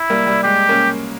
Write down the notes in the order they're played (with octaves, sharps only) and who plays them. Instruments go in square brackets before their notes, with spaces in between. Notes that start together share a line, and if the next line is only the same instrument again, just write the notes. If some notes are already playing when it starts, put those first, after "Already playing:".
Already playing: [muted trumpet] E4
[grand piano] G3 A#3
G3
[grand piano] G#3 [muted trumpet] G4
[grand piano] A#3 C#4